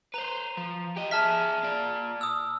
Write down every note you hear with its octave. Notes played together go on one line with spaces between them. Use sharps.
B4 C5 A#5 F7
F3
G4 D#5
G#4 E5 A5 F6 B6
A#2 D5
D#6 E6